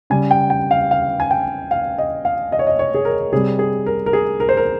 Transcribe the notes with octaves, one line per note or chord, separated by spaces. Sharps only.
C#3 G3 G#5
G5
G5
F5
F5
G#5
G5
F5
D#5
F5
D#5
C#5
D#5
C#5
G#4
A#4
C3 G3 G#4
G#4
A#4
A#4
G#4
A#4
C5
A#4